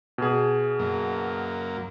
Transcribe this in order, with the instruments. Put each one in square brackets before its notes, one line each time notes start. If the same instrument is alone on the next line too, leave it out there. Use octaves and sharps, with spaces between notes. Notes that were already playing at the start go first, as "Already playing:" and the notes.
[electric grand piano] B2 G#4
[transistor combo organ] F#2 A#3